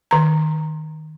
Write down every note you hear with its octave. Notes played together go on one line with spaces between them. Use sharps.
D#3 A#5